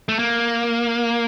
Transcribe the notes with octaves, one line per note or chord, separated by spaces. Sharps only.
A3
A#3